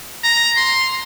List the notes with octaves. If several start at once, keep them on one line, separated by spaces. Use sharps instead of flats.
A#5
C6